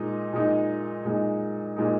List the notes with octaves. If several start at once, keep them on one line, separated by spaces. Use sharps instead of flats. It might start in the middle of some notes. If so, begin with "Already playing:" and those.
Already playing: A#2 G#3 D#4
A#2 G#3 D#4
A#2 G#3 D#4
A#2 G#3 D#4